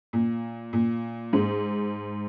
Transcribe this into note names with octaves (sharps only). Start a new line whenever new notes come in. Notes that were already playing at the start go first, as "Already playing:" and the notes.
A#2
A#2
G#2